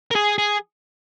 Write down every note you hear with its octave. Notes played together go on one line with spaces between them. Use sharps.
A#4
G#4
G#4